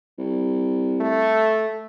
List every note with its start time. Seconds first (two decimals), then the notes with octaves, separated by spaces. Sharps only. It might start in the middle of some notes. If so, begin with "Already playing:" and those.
0.18 C2
1.00 A3